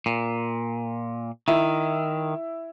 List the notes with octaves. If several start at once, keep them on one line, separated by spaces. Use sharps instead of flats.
A#2
D#3 E4